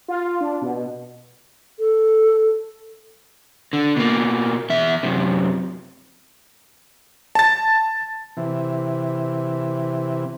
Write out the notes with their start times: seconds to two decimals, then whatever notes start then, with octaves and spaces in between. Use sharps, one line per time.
0.08 F4
0.41 D4
0.62 B2
1.79 A4
3.73 D3
3.96 B2 A#3
4.70 E2 E5
5.03 F#2 C3
7.35 A5 A6
8.37 C3 E3